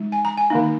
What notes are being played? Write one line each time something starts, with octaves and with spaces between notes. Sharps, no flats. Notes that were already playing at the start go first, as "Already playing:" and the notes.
Already playing: G#3 D#4
G#5
A#5
G#5
D#3 A#3 D#4